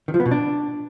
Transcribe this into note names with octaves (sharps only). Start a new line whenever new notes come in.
D#3
F3
B3
B2
D4